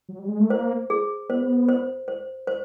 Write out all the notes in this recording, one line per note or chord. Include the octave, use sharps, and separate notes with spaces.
F#3
G3
G#3
A3
A#3 C5
G#4
B3 C5
C5
C5
C5